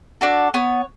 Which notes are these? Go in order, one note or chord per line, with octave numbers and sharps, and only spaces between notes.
D4 F#4 A4
B3 C#5